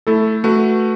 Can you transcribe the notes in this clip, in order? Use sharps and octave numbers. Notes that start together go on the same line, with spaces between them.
A3 E4 A4
A3 F#4 B4